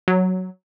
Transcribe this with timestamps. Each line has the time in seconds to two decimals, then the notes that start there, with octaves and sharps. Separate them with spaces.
0.08 F#3